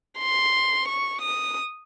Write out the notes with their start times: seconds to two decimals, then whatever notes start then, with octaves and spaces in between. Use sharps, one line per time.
0.19 C6
0.88 C#6
1.22 D#6